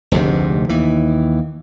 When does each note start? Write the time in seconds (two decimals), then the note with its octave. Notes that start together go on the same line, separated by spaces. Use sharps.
0.12 F1 D2 G#2 C3
0.69 D#2 E3